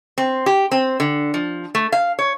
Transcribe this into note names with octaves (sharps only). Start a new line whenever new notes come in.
C4
G4
C4
D3
F3
A3
F5
C#5